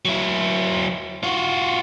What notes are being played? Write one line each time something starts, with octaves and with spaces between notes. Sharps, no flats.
F#3 E4
F4 F#4